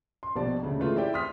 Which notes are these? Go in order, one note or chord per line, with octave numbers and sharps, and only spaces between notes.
C6
A#1 B2 G3 D5 A5
D2 C#3
E3 G#3 A3 F4
C4 E4 G4 D5 G5
C6 D#6 F6 B6